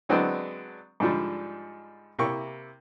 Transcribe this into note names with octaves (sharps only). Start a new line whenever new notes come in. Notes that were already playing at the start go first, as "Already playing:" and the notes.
D3 F#3 G#3 B3 C4 D4
G#2 D3 F3 G3
C3 A#3 E4 C#6